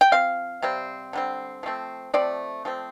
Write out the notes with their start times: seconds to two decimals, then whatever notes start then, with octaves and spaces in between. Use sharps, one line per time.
0.01 G5
0.12 F3 C4 F5
0.62 C3 G3 C4
1.13 D3 G3 C4
1.63 F3 A3 C4
2.14 F3 A3 C4 D5
2.65 F3 A3 C4